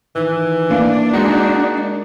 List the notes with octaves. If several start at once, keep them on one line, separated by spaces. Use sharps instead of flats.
D#3 E3
A#3 D4 E4 F5
G#3 D#4 F#4